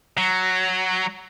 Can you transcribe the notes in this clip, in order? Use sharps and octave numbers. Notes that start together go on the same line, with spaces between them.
F#3